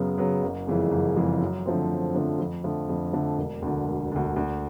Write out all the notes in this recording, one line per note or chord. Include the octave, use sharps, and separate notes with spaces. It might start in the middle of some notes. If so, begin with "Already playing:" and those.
Already playing: F#2 C#3 F#3 B3
C#3 F#3 B3
F#1
F2 C#3 E3 G#3
F#1
F2 C#3 E3 G#3
F#2
D3 F3 A3 C4
F#2
D3 F3 A3 C4
F2
D3 F3 A3
F2
D3 F3 A3
E1
D2 D3
E1
D2 D3
D2